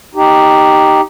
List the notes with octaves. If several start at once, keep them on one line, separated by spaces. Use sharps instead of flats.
D#4 G4